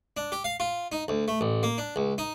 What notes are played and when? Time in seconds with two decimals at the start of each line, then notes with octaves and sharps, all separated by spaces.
0.17 D4
0.32 G4
0.44 F5
0.60 F4
0.92 D#4
1.08 D2
1.28 A3
1.41 A1
1.63 A#3
1.78 D4
1.96 C#2
2.18 D#4